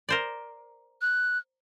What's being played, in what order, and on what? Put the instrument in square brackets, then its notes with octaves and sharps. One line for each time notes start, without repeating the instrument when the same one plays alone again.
[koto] A#4 C5 D5
[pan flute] F#6